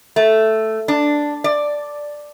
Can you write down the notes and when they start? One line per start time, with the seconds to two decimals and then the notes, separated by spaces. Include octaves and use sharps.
0.16 A3
0.88 D4
1.44 D5